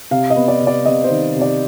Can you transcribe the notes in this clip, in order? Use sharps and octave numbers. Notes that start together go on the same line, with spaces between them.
C3 F5
D#5
B3
D5
C3
D5
C3 D#5
C5
D#3
C3
D5